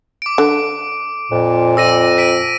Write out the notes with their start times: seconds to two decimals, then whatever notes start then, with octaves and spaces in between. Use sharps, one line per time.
0.22 D6 D7
0.38 D3
1.32 F2 A#2
1.77 F2 E6 A#6 D#7
2.18 B6 D7 D#7